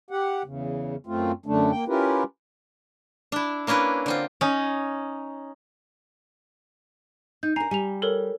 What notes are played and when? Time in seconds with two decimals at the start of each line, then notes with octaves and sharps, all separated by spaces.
0.11 G4 F#5
0.45 E2 C#3
1.07 F#2 A3 C4 F4
1.46 F#2 D3 A3 D4
1.71 A#3 G5
1.88 C#4 E4 F4 G4 A#4 B4
3.32 D4 E4
3.67 A#3 C#4 D4 E4 B4
4.06 D3 C4 F4
4.41 C#4 D#4
7.43 D#4 G6
7.56 D4 A#4 G#5 A#5 C7
7.71 G3 G#5 F7
8.02 A4 A#4 C#5